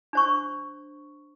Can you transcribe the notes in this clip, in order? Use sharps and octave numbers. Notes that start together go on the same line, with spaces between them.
D4 C5 C#6